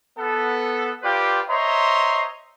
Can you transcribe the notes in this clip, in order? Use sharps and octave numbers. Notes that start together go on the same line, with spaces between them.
B3 A4
F4 G4 B4 C5 D5 G5
C5 C#5 D#5 E5 A#5 C6